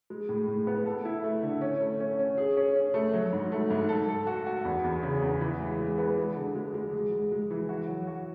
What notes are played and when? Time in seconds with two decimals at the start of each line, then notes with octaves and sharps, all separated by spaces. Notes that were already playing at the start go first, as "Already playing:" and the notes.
0.10 G#3
0.29 A2
0.48 A2
0.67 B3
0.86 A4
1.05 E4
1.24 A3
1.43 D3
1.61 C#4
1.81 A3
2.00 C#4
2.19 C#4
2.38 G#4
2.57 C#4
2.75 C#4
2.94 A3
3.13 F#3
3.33 G#2
3.52 A3
3.70 G#2
3.89 A4
4.09 A4
4.27 F#4
4.46 F#4
4.65 E2
4.84 E2
5.03 C#3
5.22 E2
5.41 E3
5.60 G#3
5.79 G#3
5.98 B3
6.17 G#3
6.37 D3
6.55 G#3
6.74 G#3
6.93 G#3
7.12 G#3
7.32 G#3
7.50 E3
7.69 F#4
7.88 F#3
8.07 F#4